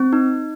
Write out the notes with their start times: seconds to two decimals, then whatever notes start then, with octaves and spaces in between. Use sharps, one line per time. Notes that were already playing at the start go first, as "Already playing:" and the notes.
Already playing: C4
0.13 D#4